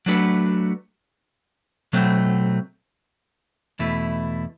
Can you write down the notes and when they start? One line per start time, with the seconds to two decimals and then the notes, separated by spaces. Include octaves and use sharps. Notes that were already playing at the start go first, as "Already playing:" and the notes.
0.06 F#3 A3 D4 F#4 B4
1.93 B2 F#3 A3 C4
3.79 E2 B2 A3 E4